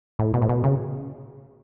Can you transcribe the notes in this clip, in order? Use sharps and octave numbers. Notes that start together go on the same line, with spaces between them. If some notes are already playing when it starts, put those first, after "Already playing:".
A2
B2
A2
B2
C#3